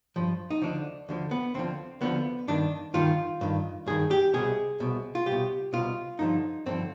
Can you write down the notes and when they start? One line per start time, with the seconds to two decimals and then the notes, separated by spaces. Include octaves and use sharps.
0.16 G2 F3
0.51 D#4
0.62 D2 D3 F3 D4
1.09 D2 D3 F3
1.31 B3
1.54 D2 D3 F3 C4
2.01 D2 D3 F3 B3
2.48 G2 D#3 D4
2.94 G2 D#3 F4
3.41 G2 D#3
3.86 G2 D#3 G#4
4.11 G4
4.34 C2 B2 G#4
4.80 C2 B2
5.15 F4
5.26 C2 G4
5.32 B2
5.73 C2 B2 F4
6.19 G2 D3 F3 D#4
6.66 G2 D3 F3 C4